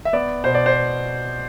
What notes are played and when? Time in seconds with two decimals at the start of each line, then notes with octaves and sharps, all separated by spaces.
0.05 E5
0.13 B3 D5
0.44 B2 C5
0.54 D5
0.66 C5